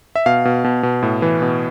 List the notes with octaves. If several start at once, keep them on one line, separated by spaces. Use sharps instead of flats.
E5
B2 F5
B2
B2
B2
A2
E3
B2